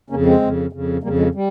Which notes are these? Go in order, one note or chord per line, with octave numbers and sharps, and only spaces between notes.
F2 C#3 A#3 C#4
G#3 C4
F2 C#3
F2 C#3
F2 C#3 G3 A#3
F3 G#3
G3